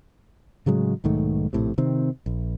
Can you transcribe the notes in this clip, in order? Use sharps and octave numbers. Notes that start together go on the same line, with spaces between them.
A2 C#3 F#3 G#3
B1 G#2 D#3 A3
A#1 A2 C3
C3 D#3 C4
A#1